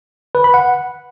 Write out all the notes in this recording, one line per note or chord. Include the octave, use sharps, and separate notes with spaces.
B4
B5
F#5